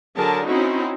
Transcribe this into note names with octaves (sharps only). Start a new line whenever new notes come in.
D3 F#3 G#4 A#4 A5
C4 C#4 D#4 E4 F#4